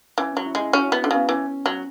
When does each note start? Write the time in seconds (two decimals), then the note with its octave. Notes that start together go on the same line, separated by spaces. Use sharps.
0.18 E3 C#4
0.32 F#3 C#4
0.46 E4
0.55 G#3
0.60 E4
0.73 C#4 F#4
0.87 B3 E4
1.01 D3 C#4
1.11 C#3 B3
1.29 E3 C#4
1.66 F#3